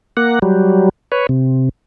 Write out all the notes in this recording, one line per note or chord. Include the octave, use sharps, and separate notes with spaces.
A#3 F#5
F#3 G3
B4 C#5
C3